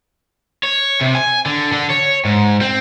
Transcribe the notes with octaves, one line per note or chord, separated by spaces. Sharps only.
C#5
C3
G#5
D3
D3
C#5
G#2
C4